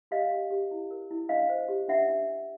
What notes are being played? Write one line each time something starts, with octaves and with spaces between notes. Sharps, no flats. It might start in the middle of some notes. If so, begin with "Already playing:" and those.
G4 D#5 F5
G4
G4
E4
A#4
E4
D4 D#5 F5
C5
G4
D4 E5 F#5
D4
D4